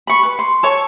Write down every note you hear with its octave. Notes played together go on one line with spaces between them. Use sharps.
B5 C#6
B4
C6
A4 C#5 C#6